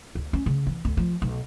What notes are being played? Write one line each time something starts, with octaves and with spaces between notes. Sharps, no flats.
D2
C#4
C#3
E3
D2
F3
B1